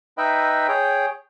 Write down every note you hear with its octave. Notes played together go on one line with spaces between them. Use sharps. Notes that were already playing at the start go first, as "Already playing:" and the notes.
D#4 B4 D#5 E5 G5 B5
G#4 C#5 G5